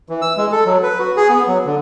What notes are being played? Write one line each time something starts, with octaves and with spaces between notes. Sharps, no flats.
E3
E6
G#3
A4
F#3
B4
F#4
G#4
B3
F#3
D3